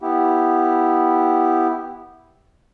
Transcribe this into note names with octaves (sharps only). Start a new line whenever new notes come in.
B3 E4 G4